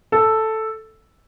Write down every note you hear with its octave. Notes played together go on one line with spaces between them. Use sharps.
A4